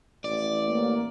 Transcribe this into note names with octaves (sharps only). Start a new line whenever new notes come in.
A1 D5
A#3